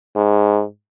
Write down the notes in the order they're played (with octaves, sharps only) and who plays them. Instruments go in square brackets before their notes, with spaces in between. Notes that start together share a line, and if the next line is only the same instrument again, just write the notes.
[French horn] G#2